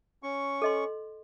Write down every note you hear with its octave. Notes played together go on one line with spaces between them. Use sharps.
C#4 C#6
A4 D#5 C6